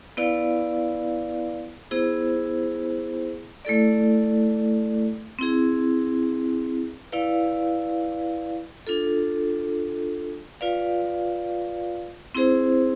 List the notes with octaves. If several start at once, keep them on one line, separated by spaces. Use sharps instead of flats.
B3 E4 B4 D5 F5
B3 E4 G#4 C5
A3 E4 A4 D5
C4 E4 G#4
E4 B4 D5 F5
D4 F4 A4
F4 B4 D5 F5
C4 E4 G#4 C5